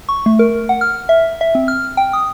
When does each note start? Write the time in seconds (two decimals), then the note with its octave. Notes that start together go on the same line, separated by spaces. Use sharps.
0.09 C#6
0.26 A3
0.39 A#4
0.69 F#5
0.81 F6
1.09 E5
1.41 E5
1.55 C4
1.68 F6
1.97 G5
2.13 D#6